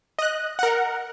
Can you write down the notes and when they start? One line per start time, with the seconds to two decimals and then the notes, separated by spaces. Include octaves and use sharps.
0.19 D#5 F#6
0.59 A#4 F#5